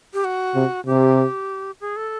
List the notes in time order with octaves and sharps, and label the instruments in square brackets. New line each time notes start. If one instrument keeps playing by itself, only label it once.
[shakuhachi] G4
F#4
[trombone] C3
[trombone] C3 [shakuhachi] G4
[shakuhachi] G#4
A4